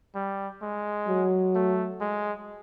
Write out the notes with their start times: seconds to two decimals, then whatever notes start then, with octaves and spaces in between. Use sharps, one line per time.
0.15 G3
0.62 G#3
1.08 F#3
1.55 A3
2.01 G#3